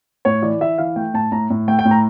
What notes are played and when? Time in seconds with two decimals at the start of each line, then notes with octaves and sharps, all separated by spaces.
0.25 A2 C#5
0.42 E3 D5
0.61 E3 E5
0.78 E3 F5
0.96 A3 G5
1.14 A2 A5
1.32 A2 A#5
1.50 A2
1.68 A3 G5
1.79 G5
1.85 A2
1.91 A#5